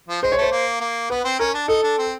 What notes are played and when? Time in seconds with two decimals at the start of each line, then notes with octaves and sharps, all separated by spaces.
0.08 F3
0.22 G#3 C5
0.32 C#5
0.38 A3 C5
0.52 A#3
0.80 A#3
1.10 B3 B4
1.24 C4
1.39 C#4 A#4
1.54 D4
1.68 D#4 A4
1.83 D4
1.98 C4